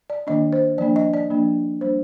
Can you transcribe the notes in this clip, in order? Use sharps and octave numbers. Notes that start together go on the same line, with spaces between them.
D5
D#3 A#3 D4 D#5
C5
F3 A#3 D4 D5
D#5
D5
F3 A#3 D4
G3 A#3 D4 C5